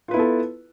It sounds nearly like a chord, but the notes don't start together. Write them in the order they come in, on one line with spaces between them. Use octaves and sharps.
F4 B4 E4 B3 A4